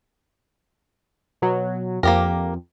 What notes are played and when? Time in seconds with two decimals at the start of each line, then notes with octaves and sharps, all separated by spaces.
1.42 B2 F#3
2.03 F2 A#3 G4 A#4